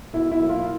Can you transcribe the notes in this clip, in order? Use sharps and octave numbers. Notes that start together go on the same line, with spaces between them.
B2 E4
E4
F#3 A#3
F4